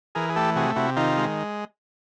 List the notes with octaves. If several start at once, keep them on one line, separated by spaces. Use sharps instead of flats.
E3 G#4 A#4
G#4
A3 G4 A4
C3 F#4 G#4
C3 E4 F#4
D#3 D#4 F4
G#3